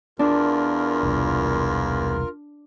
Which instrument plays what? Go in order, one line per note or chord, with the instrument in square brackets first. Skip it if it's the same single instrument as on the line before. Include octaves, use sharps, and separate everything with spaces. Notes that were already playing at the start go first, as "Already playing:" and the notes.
[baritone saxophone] E2 [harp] D4 [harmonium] F4 A#4
[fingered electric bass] E1 C2